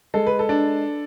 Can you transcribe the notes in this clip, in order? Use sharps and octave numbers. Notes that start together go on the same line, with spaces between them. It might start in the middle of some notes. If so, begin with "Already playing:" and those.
G#3 A4
B4
A4
D4